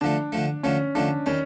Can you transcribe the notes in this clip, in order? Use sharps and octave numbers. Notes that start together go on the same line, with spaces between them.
D3 F3 A3 D4
D3 F3 A3
D3 F3 A3 C#4
D3 F3 A3 D4
D#3 G3 C#4